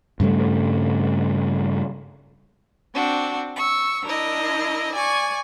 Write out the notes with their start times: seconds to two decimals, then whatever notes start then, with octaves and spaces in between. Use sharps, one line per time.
0.20 G2 C#3 G3 A3
2.93 C4 D4 F#4
3.57 C#6 E6
4.04 D4 E4 A#4 D#5
4.94 D5 G#5 C#6